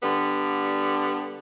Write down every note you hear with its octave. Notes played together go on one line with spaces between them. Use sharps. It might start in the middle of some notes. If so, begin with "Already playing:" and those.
D3 G3 B3